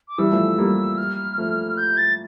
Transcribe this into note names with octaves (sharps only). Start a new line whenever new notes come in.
D6
E3 G3 E6
F3 A3
G3 A#3
F6
F3 A3
G6
A6